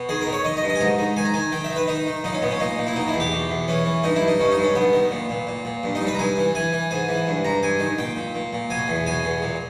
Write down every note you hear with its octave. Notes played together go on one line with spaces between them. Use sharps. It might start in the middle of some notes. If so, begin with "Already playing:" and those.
Already playing: B2
D#3 G#4
A#4
D#3
C#5
D#3 D#5
D#5
G2
D#5
G#5
G#2 A#5
D#3
D#3 G#5
A#5
D#3 G#5
D#3 G5
E5
D#3
B4
D#3 D#4
D#3
A#2 D#4
C#4
A#2 B3
C#4
A#2 D#4
A#2
E4
B2 D#4
E4
E2
G4
B2
E2
E3 C#4
E3
G2 D#4
E4
G2
D#4
G2 C#4
D#4
G2
C#4
G2 B3
D#3
A#2
A#2
A#2
A#2
G2
D#4
G2
B4
A#5
G2 G#5
E3
E3 G#5
E3
G#2 G#5
E3
G2
G2 A#5
G2 G#5
D#3
A#2 G5
A#2
A#2
A#2
B2 G#5
E2
B2 G#5
E2
A#2